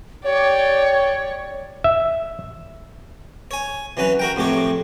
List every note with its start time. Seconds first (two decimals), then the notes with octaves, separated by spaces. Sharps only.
0.24 G4 C#5 D5
1.84 E5
3.51 C#5 G#5
3.97 E3 F#3 C#4 B4
4.19 F#4 A#4 G5
4.36 F2 A2 A3 G4 C#5